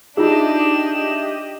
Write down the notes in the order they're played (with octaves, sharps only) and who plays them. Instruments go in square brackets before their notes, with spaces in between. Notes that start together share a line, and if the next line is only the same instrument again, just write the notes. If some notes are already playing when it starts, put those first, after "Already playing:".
[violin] D4 E7 [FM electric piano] D#4 E5 [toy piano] F4 G#4 [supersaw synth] G4 D#5